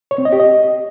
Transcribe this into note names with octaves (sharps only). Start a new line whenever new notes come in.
C#5
C4
D#5
G4
D#5